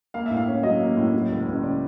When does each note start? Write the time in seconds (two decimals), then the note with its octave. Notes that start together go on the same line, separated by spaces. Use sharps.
0.14 A#3 F5
0.26 A2 E5
0.37 F5
0.48 C#4
0.63 F#3 D#5
0.80 A#3
0.97 A2
1.14 F#3
1.30 C#2
1.47 C#2
1.63 C#3 D5